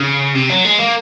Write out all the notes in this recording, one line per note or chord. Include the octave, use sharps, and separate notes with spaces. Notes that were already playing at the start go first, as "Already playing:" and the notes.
Already playing: C#3
C3
F#3
G#3
A#3